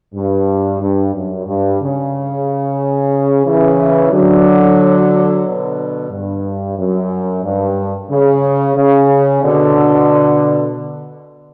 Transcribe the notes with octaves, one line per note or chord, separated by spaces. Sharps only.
G2
G2
F#2
G2
C#3
C#3 E3
D3 F#3
B2 D3
G2
F#2
G2
C#3
C#3
B2 D3